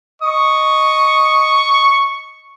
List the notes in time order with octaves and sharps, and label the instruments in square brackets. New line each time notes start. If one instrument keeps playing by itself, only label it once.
[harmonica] D#5 [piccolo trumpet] C#6